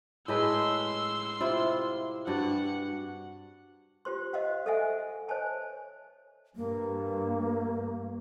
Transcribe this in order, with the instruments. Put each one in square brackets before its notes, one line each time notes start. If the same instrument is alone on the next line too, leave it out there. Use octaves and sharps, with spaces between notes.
[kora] A2 G#3 B4 [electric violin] C6 E6
[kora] C3 E4 F4
[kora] G2 F#4 D5 [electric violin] F#5
[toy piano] F4 G4 C5 C6
C5 D#5 F5 F#5
A4 C5 D#5 E5 F#5 G#5
C5 C#5 D#5 G#5 A5
[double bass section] G2 [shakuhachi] A#3